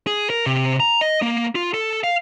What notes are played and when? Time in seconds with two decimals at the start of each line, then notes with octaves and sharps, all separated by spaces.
0.07 G#4
0.30 A#4
0.46 C3
0.80 A#5
1.01 D#5
1.22 A#3
1.55 F4
1.74 A4
2.04 F5